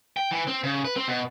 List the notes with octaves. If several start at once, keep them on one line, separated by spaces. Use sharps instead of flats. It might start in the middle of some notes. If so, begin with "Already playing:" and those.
G5
E3
C4
C#3
B4
C4
B2